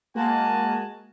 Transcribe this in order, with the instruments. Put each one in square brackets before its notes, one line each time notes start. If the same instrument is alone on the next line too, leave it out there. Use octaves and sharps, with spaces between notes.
[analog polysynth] G#3 A#3 [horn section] F#4 G#5 A5